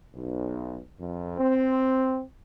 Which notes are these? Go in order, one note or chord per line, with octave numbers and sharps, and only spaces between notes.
B1
F2
C4